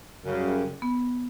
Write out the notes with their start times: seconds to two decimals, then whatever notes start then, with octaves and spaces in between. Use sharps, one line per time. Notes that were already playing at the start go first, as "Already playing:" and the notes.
0.24 F#2 C#3 G3
0.82 B3